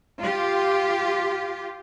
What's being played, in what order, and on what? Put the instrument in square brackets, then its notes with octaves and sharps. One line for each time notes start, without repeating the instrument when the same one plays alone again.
[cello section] F4 G4